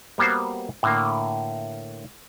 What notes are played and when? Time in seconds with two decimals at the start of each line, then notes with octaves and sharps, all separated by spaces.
0.18 G3 A#3 B3 F#4 C5
0.83 A2 D3 A#3